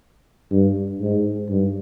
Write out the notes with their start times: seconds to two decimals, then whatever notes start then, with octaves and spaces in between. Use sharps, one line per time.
0.51 G2
1.01 G#2
1.49 G2